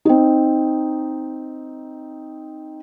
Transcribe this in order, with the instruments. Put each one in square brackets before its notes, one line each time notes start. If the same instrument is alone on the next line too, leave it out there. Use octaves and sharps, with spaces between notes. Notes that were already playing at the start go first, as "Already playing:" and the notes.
[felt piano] C4 D#4